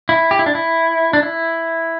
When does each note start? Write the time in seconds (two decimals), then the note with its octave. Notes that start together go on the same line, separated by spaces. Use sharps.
0.09 E4
0.31 G4
0.39 E4
0.46 D4
0.55 E4
1.13 D4
1.22 E4